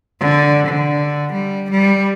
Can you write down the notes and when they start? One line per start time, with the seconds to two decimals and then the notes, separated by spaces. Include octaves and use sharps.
0.20 D3
0.67 D3
1.33 G3
1.71 G3